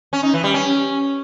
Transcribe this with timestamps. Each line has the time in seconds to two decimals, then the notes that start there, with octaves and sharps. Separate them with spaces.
0.13 C#4
0.23 D#4
0.33 E3
0.44 G3
0.54 C#4